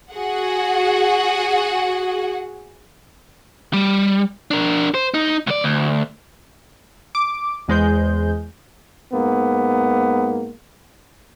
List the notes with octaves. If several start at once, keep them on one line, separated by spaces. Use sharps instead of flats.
F#4 G#4 F#5
G3
D4 A#4
C5
D#4
C#2 D5
D2
D6
E2 G#3 C5 G6
G#2 A#3 B3